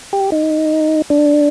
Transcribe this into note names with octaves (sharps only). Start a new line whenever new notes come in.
G4
D#4
D4